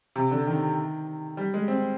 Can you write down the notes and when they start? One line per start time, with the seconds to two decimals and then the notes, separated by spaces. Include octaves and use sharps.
0.16 C3
0.31 D3
0.47 D#3
1.37 G3
1.54 G#3
1.68 C4